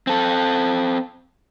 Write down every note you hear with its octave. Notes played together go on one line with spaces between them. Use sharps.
C4 A4